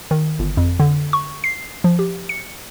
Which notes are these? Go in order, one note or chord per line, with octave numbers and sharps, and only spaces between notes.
D#3
G1
F2
D3
C#6
C7
F3
G4
C#7